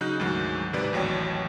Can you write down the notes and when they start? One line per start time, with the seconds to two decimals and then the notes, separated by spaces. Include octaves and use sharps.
0.01 C#3 F#3 D#4 F#6 G6
0.20 D2 G#2 D#3 F#3
0.73 G1 G#2 C3 B4 D5
0.93 A1 D#2 F#3 C#5 G5